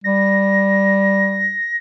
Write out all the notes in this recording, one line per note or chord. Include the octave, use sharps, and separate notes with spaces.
G3 A#6